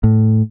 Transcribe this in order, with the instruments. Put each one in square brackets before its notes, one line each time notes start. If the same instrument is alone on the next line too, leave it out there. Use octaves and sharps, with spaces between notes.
[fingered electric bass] A2